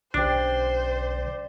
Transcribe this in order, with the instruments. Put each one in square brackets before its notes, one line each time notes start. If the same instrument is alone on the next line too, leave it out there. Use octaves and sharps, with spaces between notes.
[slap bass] B1 D3 C#4 [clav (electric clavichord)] D4 [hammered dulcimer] G4 D5 [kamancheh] C5